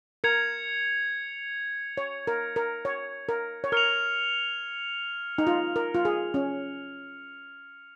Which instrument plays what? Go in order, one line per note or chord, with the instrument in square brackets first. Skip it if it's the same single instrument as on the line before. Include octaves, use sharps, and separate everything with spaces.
[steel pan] A#4 [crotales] G#6 C#7 F7
[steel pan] C#5
A#4
A#4
C#5
A#4
C#5
[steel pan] A#4 [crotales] F6 C#7 F7
[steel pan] D#4
F4
A#4
F4
G#4
C#4